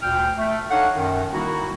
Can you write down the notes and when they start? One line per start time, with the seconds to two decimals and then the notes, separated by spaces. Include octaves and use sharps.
0.02 D2 A#2 G5 F6
0.38 A3
0.70 D4 D#4 A4 C#5 F5 F#5
0.95 F#2 B2 D#3
1.33 D#3 G3 A#3 D#4 E4 F#4